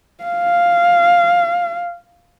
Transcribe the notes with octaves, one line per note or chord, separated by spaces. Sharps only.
F5